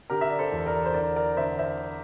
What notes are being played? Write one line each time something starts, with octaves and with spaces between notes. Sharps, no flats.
D3 G4 A#4
E5
D5
A4 C5
E2
A#4 D5
C5
D3 A#4 D5
A#4 D5
D3 C5 E5
C5 E5